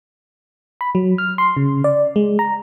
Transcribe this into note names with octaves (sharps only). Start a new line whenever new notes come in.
B5
F#3
F6
C6
C#3
D5
G#3
A#5